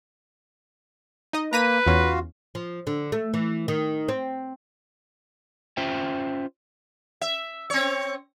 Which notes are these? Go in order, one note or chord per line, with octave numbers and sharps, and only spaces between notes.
D#4 D#5
A#3 B4 A#5 B6 D#7
E2 C#4 F4 F#4 F5
F3
D3
A3
E3
D#3
C4
C#4 F4 C5 E5 G5
E5
C4 C#5